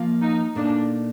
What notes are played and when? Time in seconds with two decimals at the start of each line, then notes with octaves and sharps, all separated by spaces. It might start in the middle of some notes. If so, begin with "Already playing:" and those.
Already playing: F3 A#3 F4
0.21 D#4
0.55 A#2 A3 D4 D#4